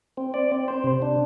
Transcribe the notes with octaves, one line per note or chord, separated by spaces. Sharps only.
C4
D5
C4
C5
C3
D4